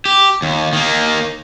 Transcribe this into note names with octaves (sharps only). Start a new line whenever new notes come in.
G4
D#2
D#3 A#3